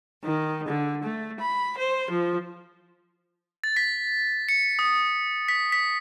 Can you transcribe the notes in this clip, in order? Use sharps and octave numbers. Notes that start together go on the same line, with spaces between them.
D#3
D3
A3
B5
C5
F3
A6
B6
C#7
D#6
B6
B6